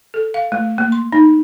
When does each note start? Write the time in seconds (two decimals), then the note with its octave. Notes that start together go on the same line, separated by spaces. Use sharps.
0.14 A4
0.34 F5
0.52 A3
0.78 A#3
0.92 C6
1.13 D#4